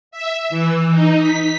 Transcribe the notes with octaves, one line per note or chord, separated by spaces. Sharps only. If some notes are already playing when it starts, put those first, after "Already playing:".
E5
E3
D#4
B6